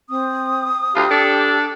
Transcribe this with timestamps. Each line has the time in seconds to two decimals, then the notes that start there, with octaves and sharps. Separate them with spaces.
0.09 C4 D#6
0.94 D2 F4 G4 F5
1.11 D4 A4